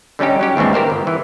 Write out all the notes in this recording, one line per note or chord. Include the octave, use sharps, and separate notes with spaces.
D3 G3 C#4 D#4 G4
F#3 C#4 G4
D#2 G#2 E3 C4 D4
G4 A#4 C5 F5
G1
E3